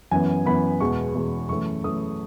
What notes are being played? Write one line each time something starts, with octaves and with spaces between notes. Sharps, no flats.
F#2 E3 B3 G#5
F#2 E3 B3 B5
E2 B2 G#3 B3 C#6
E2 B2 G#3 B3
F#2 E3 A3 C#4 C#6
F#2 E3 A3 C#4 D#6